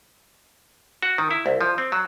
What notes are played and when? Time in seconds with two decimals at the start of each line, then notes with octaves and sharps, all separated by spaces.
1.02 F#4
1.18 D#3
1.31 E4
1.46 C2
1.61 F3
1.78 C4
1.92 F#3